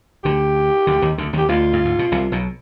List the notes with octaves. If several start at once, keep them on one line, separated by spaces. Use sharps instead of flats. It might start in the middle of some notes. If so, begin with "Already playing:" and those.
D2 D3 G4
D2 D3
D#2 D#3
D2 D3
D#2 D#3 G4
D2 D3 F4
G2
G#2
B2
C2 C3
B1 B2